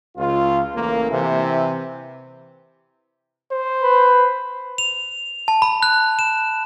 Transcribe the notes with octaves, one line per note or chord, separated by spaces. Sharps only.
C#2 F4
A1 A#3
C3 E3
C5
B4
F7
A5
B5
F#6
E7